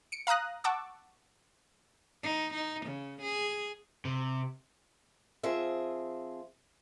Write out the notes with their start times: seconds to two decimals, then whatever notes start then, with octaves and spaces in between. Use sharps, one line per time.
0.12 C#7 D7
0.27 F5 A#5 D#6 F#6 A#6
0.64 F#5 A5 C#6 D6 E6
2.23 D#4
2.54 D#4
2.86 C#3
3.22 G#4
4.05 C3
5.43 F3 C4 G#4 E5